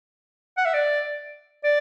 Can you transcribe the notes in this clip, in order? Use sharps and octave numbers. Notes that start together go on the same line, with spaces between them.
F#5
E5
D5
D5